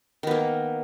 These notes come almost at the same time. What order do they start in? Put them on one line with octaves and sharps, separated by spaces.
D#3 B3 A#3